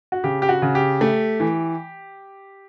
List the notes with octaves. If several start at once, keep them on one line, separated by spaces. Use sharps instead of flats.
F#4
C#3 G4
G4
F#4
C#3
G4
A3
E3